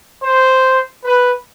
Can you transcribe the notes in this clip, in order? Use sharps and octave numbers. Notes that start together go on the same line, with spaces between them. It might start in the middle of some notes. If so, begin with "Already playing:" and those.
C5
B4